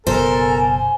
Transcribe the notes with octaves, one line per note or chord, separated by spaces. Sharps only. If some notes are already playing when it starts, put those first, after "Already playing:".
F#1 B2 B3 A4 A#4 C5 G#5